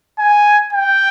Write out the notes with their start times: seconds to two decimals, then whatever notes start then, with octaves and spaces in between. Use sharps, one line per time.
0.19 G#5
0.73 G5